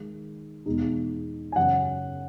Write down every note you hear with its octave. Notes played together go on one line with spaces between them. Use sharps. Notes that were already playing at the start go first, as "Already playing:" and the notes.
Already playing: D#3 G#3 D#4
E2 B2 G#3 D#4
G#5
F#2 C#3 F#3 C#4 F#5